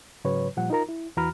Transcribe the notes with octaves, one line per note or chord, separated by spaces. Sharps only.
G#2 C#3 F#3 B4 C#5
A#2 F3 G3 F#5
D#4 F4 A#4 A#5
E4
E2 E3 F#4 A#5 B5 F6